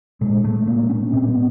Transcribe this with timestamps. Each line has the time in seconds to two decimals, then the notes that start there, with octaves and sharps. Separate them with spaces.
0.21 A#2 G#3
0.44 A3
0.67 A#2 A#3
0.90 C#4
1.13 A#2 C4
1.29 B3